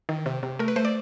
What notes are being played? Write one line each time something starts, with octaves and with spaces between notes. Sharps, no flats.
D#3
C3
C3
A3 A#4
B4
A3 C5
D5